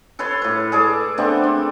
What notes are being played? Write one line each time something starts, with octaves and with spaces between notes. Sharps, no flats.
A4 B4 C#5 C6
A2 B4
G#4 A4 D5
A3 B3 C4 D4
C4